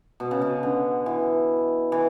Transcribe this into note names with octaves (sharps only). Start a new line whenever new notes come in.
B2
C#3
B2
D3
E3
E3